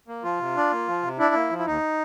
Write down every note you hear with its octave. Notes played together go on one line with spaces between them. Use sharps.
A#3
F3 F4
C3
D4
A#3
F3
C3
D4 E4
A#3
F3
E4
D#2 D#4